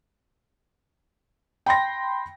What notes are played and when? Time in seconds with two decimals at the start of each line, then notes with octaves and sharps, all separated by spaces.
1.66 G5 B5 C6 A#6